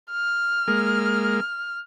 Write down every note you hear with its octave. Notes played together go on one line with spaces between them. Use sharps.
F6
G#3 A#3